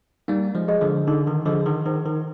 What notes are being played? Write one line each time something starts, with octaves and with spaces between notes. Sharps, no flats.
G3 A#3 D#4
F3 G#3
G#4 D#5
D3 F3
D3 D#4
D#3
D3 F3 G#4 D#5
D#3
D#3 C5
D#3